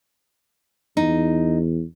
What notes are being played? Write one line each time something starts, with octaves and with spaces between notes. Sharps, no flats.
E2 D#4